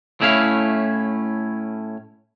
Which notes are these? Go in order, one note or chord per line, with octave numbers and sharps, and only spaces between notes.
A2 A3 C#4 E4 F5